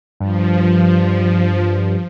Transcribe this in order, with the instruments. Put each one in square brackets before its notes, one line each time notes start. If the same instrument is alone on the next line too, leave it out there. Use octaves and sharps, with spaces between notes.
[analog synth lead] G2 [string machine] F3